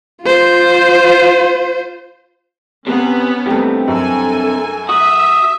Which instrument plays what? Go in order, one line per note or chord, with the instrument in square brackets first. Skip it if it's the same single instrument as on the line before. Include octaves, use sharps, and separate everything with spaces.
[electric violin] F4 C5
[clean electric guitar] C3 [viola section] B3 C#4
[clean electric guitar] G2 C3 C4 [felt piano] G3 A3
[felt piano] F#2 [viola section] A4 G#5
[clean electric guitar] F#4 [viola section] E5 [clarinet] D#6